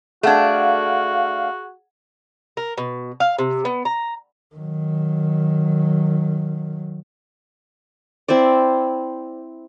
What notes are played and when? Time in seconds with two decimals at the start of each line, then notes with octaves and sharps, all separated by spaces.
0.23 A3 D4 F#4 G#4 F5 F#5 G#6
2.57 A#4
2.77 B2
3.20 F5
3.39 C3
3.65 B3
3.85 A#5
4.55 D#3 F#3
8.28 C4 E4 C5 D5